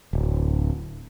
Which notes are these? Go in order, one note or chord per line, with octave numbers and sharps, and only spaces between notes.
D1